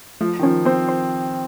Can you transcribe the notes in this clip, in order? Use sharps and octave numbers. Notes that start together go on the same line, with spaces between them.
F3 A3
D#3
F3 C#4
C4 C5
C5